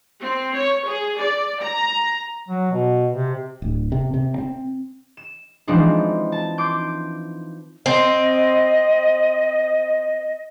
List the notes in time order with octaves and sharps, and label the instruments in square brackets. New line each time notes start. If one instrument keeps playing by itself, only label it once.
[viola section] C4
C#5
G#4
D5
A#5
[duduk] F#3
B2
C3
[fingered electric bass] D1
C3
C3
C4
[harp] E7
E3 F3 G#3 C4 D4 D#4
A5
C6 D6 G6
[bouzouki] C4 [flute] D#5